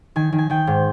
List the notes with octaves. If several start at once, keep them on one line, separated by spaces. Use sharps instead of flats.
D#3 G#5
D#3
G#5
D#3 G5
G#2